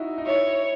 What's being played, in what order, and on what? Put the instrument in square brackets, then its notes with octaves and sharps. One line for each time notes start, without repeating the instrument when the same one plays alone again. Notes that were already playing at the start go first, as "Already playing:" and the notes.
Already playing: [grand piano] D#4 E4 F#4
D#4
[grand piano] E4 [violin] C#5